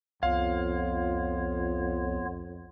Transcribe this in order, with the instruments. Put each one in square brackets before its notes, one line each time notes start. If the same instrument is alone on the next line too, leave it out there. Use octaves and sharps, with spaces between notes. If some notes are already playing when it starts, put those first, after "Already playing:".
[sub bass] C2 [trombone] F2 [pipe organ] B3 F4 C#5 [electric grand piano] F5